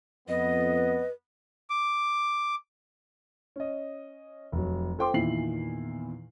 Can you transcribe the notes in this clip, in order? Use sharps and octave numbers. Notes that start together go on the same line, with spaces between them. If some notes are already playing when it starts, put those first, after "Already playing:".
F2 B3 B4 D#5
D6
C#4 D#5
F1 F#3
F4 A4 C5 G5 C6 D6
E2 A#2 D#3 E4 C7 F#7